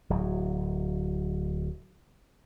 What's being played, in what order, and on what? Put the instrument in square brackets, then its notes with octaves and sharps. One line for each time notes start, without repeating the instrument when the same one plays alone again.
[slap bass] D1 F#3